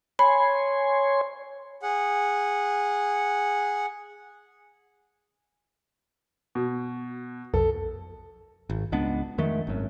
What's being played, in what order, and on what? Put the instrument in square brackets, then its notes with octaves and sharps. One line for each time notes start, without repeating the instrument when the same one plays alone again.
[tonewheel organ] C#5 G#5 C6 [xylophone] B5
[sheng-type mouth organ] G#4 F#5
[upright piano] B2
[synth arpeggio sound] B1 F2 [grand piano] A4
[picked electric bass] G#1
C#2 G#3 B3 D4
F2 D#3 G#3 A3
G#1 F#2